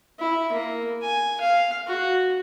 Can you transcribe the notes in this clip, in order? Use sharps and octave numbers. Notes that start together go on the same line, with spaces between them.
E4
A#3
G#5
F5
F#4